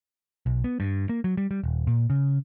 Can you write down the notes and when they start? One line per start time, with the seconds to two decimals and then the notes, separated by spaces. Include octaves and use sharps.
0.46 B1
0.64 B3
0.80 G2
1.09 A#3
1.24 F#3
1.37 G3
1.51 G3
1.64 D#1
1.87 A#2
2.10 C#3